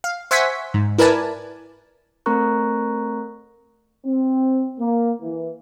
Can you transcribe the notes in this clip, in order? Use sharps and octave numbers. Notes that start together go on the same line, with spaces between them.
F5
C5 E5 F#5 G#5 C#6 B6
G#2
E4 A#4 B4 D5 G#5 A5
A3 C4 A#4 A#5 C#6 F#6
C4
A#3
E3